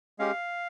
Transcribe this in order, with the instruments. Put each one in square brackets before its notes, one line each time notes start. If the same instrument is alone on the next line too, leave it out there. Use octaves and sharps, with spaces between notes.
[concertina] G#3 C#4 G4 F5